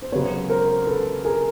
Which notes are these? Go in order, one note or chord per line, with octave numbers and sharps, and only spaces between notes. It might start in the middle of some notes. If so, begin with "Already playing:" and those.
C5
F#2 C#3 F#3 B3 B4 C#5
A#4 C5
A4 B4
G#4 A#4